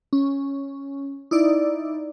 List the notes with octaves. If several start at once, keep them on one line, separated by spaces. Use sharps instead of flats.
C#4
D#4 E4 D5